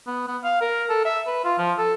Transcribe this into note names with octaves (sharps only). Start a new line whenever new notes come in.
B3
B3
F5
A#4
A4
E5
B4
F4
F3
A4